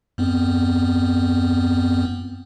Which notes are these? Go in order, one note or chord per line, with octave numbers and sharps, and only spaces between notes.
F#2 B3 C4